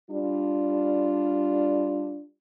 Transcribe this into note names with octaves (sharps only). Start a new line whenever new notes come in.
G3 D4 F4